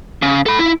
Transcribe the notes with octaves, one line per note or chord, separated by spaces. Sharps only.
C#3
A4 B5
E4